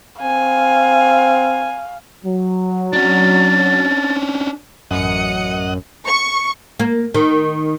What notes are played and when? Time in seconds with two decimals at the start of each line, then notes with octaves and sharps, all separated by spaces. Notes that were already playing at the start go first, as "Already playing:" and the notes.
0.22 C4 F5 G#5
2.25 F#3
2.93 C#4 D4 A6
4.91 A1 F#2 D#5 F#5 D#6 C#7
6.06 C#6
6.80 A#3
7.14 D#3